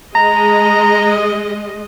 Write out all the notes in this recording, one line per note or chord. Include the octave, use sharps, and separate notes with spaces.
G#3 D#5 A#5